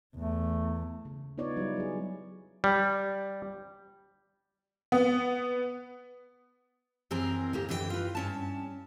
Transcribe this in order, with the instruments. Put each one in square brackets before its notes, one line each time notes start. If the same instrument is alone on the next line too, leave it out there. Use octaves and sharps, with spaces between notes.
[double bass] E2 [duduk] A3
[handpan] C#3
B3 D#4 F4 C#5 D5
F#3 G3 E4 B4
F#3 G#4
[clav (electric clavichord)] G3
[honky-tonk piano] B3
[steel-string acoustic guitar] F#2 E3 C4 G#4 A#4 A#5
D2 A#3 G4
F#2 D3 E3 G#4 G5
F4 B4
G2 C#4 A5